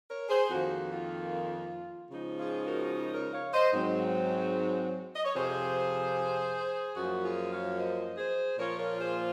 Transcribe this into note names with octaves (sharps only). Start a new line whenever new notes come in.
A#4 C#5
G#4 C5
F2 D#3 A#3 F#4
F4
C#3 F3 G#3 D#4
F4 G#4
F#4 A#4
A#4 C#5
C#5 F5
C5 D#5
G#2 F#3 C4
D#5
C#5
F2 C3 F3 G#4 C5
F#2 F3 A#3 F#4
F4 G#4
C#5 F5
C5 D#5
G#4 C5
A#2 F3 A#3 F4 A#4 C#5
A#4 C#5
G#4 C5